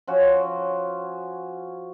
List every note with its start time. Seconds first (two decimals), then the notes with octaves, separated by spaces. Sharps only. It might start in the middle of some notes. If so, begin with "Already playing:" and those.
0.07 F3 C#4 F#4 C#5